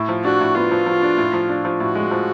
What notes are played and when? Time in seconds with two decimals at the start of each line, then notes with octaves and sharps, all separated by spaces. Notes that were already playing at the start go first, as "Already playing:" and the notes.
Already playing: A2
0.09 F3
0.24 D4 F#4
0.40 A2
0.56 B3 F4
0.71 F3
0.86 F3
1.03 D4
1.18 A2
1.34 F3
1.49 D4
1.65 F3
1.80 A2 F#4
1.95 G#3
2.11 F3